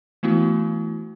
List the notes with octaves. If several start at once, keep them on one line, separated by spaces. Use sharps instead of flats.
E3 A3 B3 E4 F#4